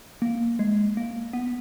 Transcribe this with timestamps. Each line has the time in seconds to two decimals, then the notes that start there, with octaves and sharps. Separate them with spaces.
0.22 A#3
0.59 G#3
0.97 A#3
1.33 B3